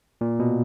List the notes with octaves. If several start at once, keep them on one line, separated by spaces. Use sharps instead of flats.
A#2
B2